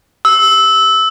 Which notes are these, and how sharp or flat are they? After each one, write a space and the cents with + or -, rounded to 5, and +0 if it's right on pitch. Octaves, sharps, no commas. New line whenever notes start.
E6 -20